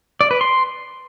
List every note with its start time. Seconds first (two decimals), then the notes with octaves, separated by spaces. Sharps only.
0.21 D5
0.31 B4
0.41 C6